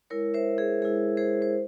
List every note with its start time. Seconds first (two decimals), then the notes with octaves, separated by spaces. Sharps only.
0.10 G#3 E4 A#4 C#5
0.34 C5 E5
0.58 G#4
0.82 G#3 E4 G#4
1.17 G#4 C5
1.42 C5